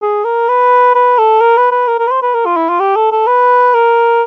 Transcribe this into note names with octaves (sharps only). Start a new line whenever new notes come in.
G#4
A#4
B4
B4
A4
A#4
B4
B4
A#4
A#4
B4
C5
B4
A#4
F4
E4
F4
G4
A4
A4
B4
A#4